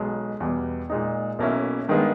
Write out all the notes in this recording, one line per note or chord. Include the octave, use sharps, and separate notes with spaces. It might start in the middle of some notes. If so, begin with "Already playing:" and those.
Already playing: B1 B2 G#3
E2 B2 G3 B3 G4
A#2 G#3 D#4
B1 B2 A#3 C#4 E4
G2 D#3 G#3 B3